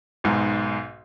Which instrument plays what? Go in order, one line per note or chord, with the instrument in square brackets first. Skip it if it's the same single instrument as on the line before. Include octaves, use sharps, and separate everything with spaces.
[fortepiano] B1 G#2